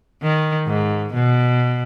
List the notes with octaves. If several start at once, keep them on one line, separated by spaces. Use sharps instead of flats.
D#3
G#2
B2